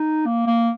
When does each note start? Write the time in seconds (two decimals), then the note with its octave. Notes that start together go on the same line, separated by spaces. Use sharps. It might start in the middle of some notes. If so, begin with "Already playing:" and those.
Already playing: D#4
0.26 A#3
0.47 A#3